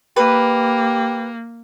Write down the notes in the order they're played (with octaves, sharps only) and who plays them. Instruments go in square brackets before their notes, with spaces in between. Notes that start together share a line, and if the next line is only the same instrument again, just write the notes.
[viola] A#3 [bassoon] G4 [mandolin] B4